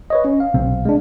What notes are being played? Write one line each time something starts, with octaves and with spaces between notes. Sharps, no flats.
B4 C#5 D#5
C#4
F5
B1 C3 C4
G#3 D4